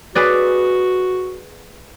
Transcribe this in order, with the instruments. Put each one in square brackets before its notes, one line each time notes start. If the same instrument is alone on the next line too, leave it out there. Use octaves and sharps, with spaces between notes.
[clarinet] F#4 [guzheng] G#4 B4 D5